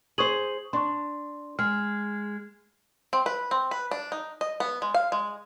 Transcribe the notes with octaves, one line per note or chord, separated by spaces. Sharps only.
G#4 C5 C#6 D#6 F#7
D4 C6 C#6
G#3 F6
C4
B4
C4
B4
D4
D#4
D#5
B3
G#3
F5
G#3